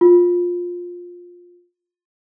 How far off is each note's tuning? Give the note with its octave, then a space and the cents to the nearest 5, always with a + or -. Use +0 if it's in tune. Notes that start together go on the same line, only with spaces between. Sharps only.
F4 +15